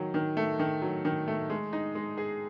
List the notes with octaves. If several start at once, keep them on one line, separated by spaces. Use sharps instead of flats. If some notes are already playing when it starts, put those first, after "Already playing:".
Already playing: D#3 F#3
D#3
A3
D#3
F#3
D#3
A3
G#3
D#4
G#3
G#4